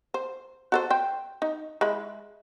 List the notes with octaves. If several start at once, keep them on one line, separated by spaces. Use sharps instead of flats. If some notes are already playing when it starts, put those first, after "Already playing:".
C5
F#4 A4 C5
C5 G5
D#4
G#3 E4 B5